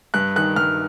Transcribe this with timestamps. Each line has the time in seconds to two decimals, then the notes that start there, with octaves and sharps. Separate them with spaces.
0.14 G2 F#6
0.36 D#3 F#6
0.56 G2 F6